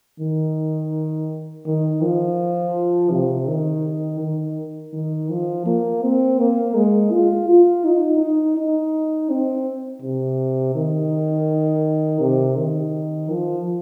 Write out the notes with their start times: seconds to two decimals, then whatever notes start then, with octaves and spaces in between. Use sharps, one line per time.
0.20 D#3
1.66 D#3
2.02 F3
3.11 C3
3.48 D#3
4.21 D#3
4.93 D#3
5.29 F3
5.66 A#3
6.03 C4
6.39 A#3
6.75 G#3
7.11 F4
7.48 F4
7.85 D#4
8.20 D#4
8.57 D#4
9.30 C4
10.02 C3
10.75 D#3
12.20 C3
12.57 D#3
13.30 F3